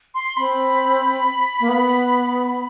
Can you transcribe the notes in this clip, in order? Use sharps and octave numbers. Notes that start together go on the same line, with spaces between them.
C6
C4 B5
A#3
B3